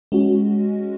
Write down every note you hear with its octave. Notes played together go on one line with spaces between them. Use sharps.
G#3 C#4 F#4